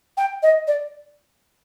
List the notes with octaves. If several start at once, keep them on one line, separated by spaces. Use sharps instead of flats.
G5
D#5
D5